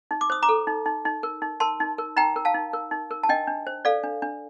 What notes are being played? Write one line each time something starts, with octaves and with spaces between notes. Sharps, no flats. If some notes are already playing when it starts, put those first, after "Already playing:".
D#4
D6
C5 D#6
A#5 D6
A4
D#4
D#4
D#4
A#4
D#4
A#4 A5 C6
D#4
A#4
D#4 G5 A#5
A#4
F5 A5
D#4
A#4
D#4
A#4
A5
D4 D#5 G5
D4
C5
A4 D5 F5
D4
D4